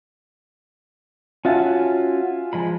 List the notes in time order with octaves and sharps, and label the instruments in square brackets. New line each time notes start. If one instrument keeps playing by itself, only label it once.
[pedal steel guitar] C#4 F#4 A5 [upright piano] F4 E5 G#5
[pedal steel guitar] F3 G#3 B5